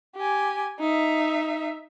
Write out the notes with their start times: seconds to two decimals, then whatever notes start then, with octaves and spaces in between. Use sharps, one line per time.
0.16 G4 G#5
0.80 D#4 E5